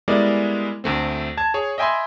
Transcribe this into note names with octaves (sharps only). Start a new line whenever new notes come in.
G3 G#3 B3 E4 A#4 D5
D2 A3 C4
A5 G#6
G#4 C#5
D#5 E5 G5 G#5 B5 C6